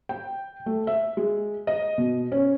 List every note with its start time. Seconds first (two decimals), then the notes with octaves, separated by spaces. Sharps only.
0.09 G5
0.66 A3
0.87 E5
1.17 G#3
1.67 D#5
1.98 B2
2.32 C#4